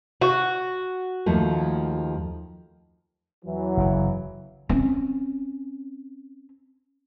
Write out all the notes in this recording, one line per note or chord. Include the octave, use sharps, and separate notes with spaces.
F#4
D#2 F3 A3
E2 E3 F#3
F#1 C#3
C4 C#4